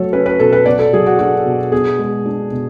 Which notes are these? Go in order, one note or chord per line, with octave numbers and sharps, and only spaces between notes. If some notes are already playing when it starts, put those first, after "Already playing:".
Already playing: F#3 A3 A4 C#5
C#4 B4
B4
B2 A4
B4
B3 D5
A4
F#3 G#4
F#4
D4 F#4
B2
B3 G#4
G#3
D4
B2